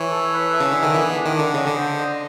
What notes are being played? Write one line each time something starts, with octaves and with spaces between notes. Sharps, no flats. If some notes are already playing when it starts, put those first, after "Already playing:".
Already playing: E3 C#5
A4
B4
E5
C#3
D3 G#4
D#3
E3 B3
D4
D#3
D3 D4
C#3 D#5
D3
C5
D#5